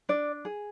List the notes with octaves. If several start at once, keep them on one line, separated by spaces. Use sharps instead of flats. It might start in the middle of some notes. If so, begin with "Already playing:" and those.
D4 D5
G#4